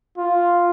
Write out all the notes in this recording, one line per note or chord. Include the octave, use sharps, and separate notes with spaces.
F4